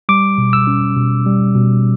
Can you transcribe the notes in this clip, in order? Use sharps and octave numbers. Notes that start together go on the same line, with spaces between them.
G3 D6
B2
E6
C#4
B2
G3
B2